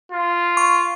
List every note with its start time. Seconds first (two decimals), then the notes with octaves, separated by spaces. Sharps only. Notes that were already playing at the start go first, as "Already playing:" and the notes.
0.12 F4
0.57 C#6